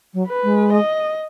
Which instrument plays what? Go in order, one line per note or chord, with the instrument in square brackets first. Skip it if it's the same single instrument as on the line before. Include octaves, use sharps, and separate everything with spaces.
[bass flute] F#3
[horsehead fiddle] B4
[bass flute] G#3
[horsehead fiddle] D#5